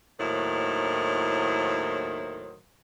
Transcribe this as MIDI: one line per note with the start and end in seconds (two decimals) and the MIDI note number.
0.19 2.56 39
0.19 2.56 45
0.19 2.56 51
0.19 2.56 54
0.19 2.56 64
0.19 2.56 72